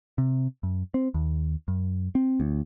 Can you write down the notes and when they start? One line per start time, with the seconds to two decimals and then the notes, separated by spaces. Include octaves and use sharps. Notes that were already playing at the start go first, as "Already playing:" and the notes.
0.18 C3
0.63 F#2
0.94 C4
1.14 D#2
1.68 F#2
2.15 C4
2.40 D2